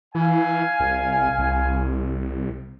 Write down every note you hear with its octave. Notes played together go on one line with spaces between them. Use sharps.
E3 F5 G#5
C2
C2